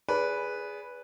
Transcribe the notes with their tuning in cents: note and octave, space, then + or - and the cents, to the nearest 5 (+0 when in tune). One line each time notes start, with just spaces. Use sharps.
G#4 +0 B4 -5 D5 -35